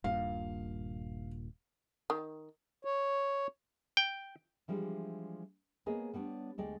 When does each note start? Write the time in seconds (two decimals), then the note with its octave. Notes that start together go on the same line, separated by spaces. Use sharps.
0.04 D#1 G2 A#2 F5
2.10 D#3
2.85 C#5
3.97 G5
4.68 E3 F3 G3 G#3 D4 E4
5.86 G#3 A#3 B3 G#4 C#5 D#5
6.14 G3 B3 D4 C#5
6.58 D2 G#3 D5 G5